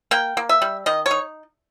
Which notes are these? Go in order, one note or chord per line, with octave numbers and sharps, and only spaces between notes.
A#3 G5
A#3
E5
G3
D#3 D#5
C#5
D#4